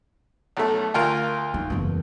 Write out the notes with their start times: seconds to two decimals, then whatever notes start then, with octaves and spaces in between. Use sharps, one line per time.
0.57 B1 A3
0.94 D2 F4 A#4
1.54 D#4
1.70 F#1 E2